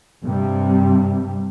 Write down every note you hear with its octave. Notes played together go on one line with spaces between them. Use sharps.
G2 C3 G3